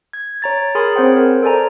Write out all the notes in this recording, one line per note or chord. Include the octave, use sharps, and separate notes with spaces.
G#6
C#5 A#5 A6
G#4 A#4 G#5 B5 C6 D#6
C4 C5 C#5 F#5 G5
A#4
A4 C5 D5 G#5 A#5